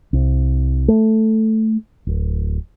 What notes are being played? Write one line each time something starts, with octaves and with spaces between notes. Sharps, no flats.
C2
A3
D1